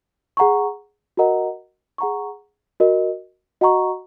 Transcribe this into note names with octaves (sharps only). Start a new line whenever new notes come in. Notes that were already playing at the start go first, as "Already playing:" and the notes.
G#4 F#5 A#5 C#6
F#4 A#4 D#5 F#5 A#5
G#4 F#5 A#5 C#6
F#4 A#4 D#5
F#4 D#5 F#5 A#5 C#6